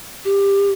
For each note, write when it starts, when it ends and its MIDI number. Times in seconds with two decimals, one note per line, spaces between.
0.25 0.72 67